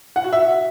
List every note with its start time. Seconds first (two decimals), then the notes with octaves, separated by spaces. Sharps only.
0.16 F#5
0.24 F#4
0.33 E5